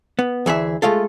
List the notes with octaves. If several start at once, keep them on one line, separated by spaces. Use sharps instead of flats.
B3
D2 E3 G#4 E5
G#3 A3 F4 A4